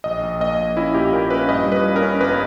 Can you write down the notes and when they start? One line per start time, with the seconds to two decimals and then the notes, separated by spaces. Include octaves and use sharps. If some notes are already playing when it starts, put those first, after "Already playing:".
0.04 A#1 D#5
0.23 A#1
0.40 A#3 D#5
0.58 A#1
0.77 C#4 E4
0.94 A#2 G4
1.13 A#2 A#4
1.30 C#4 B4
1.48 G2 D#5
1.66 G3
1.72 B4
1.84 C#4
1.96 A#4
2.02 C#4
2.20 G1 B4